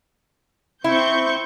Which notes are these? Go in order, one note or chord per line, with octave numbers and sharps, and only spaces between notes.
C4 E4 C#6 G6